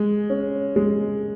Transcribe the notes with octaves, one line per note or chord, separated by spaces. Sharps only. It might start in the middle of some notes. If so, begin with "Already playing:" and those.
Already playing: G#3
C#4
G#3